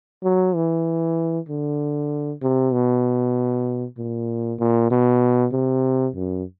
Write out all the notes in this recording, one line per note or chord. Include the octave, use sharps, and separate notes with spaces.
F#3
E3
D3
C3
B2
A#2
A#2
B2
C3
F#2